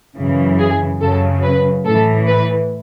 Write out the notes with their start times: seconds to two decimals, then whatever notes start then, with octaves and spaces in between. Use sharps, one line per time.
0.16 F#2 C#3 E3
0.59 G#4
1.01 F#2 C#3 F#3 A4
1.43 B4
1.85 A2 E3 A4
2.28 B4